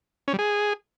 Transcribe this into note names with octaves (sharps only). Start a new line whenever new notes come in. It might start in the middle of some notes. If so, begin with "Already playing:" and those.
C#4
G3
G#4